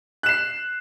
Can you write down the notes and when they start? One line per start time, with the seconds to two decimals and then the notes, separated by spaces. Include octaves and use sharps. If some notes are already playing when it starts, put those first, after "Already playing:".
0.23 F#6
0.26 E7
0.29 C7